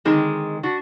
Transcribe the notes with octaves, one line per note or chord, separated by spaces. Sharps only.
D3 D#3 G#3 C4
D4 F#4